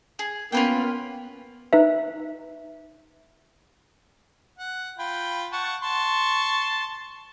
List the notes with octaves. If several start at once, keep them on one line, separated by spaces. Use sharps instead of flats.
G#4
A#3 B3 C#4 F4 B4 G5
D#4 B4 E5
F#5
F4 G5 B5
F#5 A5 C#6
A5 C6 C#6